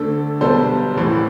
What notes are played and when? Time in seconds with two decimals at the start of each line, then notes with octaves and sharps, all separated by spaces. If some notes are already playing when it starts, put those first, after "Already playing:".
Already playing: D2 D3 A3 A4
0.41 B1 B2 G3 B3 A4 C5
0.96 A1 A2 E3